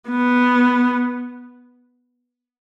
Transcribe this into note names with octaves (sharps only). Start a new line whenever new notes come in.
B3